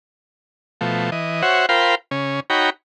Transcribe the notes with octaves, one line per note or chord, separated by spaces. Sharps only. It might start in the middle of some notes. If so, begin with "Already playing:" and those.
B2 F3 A3
E3 D#5
F#4 C5 C#5 E5 F#5
F4 A#4 C5 F5 G5 B5
C#3 C#4
D#4 F#4 C#5 G5 A#5 B5